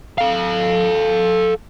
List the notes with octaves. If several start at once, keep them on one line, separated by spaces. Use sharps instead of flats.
A4 F5